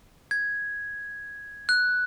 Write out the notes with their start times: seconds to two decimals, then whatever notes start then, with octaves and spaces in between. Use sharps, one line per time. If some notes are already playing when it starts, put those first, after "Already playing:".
0.31 G#6
1.69 F#6